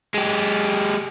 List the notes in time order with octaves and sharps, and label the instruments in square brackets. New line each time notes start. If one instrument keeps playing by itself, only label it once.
[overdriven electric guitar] G#3 G4